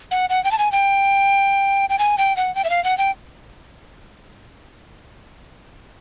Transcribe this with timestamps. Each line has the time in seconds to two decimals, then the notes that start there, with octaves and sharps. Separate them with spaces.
0.11 F#5
0.30 F#5
0.44 G5
0.51 A5
0.59 G#5
0.72 G5
1.89 G5
1.99 G#5
2.18 G5
2.37 F#5
2.55 G5
2.64 E5
2.70 F5
2.84 F#5
2.98 G5